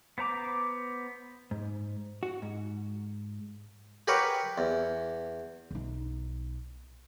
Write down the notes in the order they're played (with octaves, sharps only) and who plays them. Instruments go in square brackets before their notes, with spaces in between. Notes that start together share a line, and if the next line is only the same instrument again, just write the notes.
[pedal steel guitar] B3 C5 A#5 D6
[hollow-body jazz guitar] G#2
F#4
G#2
[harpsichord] G4 G#4 A#4 B4 C#5 F#5
E2
[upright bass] B1 D#4